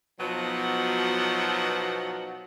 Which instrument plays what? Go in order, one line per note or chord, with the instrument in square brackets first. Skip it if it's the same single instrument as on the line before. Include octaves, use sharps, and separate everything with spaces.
[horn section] B2 F3 F#3 B3 D#4 F#5